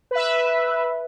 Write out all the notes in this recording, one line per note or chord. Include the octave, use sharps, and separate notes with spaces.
B4 E5